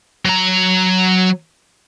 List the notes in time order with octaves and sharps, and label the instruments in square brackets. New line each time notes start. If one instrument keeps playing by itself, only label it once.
[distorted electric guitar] F#3 A#5